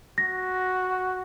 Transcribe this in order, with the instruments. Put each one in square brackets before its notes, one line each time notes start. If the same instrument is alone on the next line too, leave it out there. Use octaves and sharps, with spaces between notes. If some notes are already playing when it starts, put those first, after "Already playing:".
[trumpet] F#4 [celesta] A#6